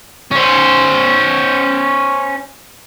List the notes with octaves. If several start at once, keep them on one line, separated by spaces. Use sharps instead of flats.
C#4 C5